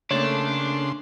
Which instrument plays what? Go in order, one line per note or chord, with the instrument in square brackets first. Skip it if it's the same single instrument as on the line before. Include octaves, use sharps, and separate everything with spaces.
[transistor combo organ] C#3 C6 [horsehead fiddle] A3 [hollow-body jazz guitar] A#3 A4 C#5 [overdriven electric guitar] D4